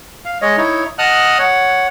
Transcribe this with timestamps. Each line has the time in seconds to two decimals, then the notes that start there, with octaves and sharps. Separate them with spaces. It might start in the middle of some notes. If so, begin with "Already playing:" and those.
0.25 F5
0.42 G#3 C#5 D#5
0.58 D#4 E4 C#5
0.98 D#5 F#5 A5 D#6 F6 F#6
1.38 C#5 F#5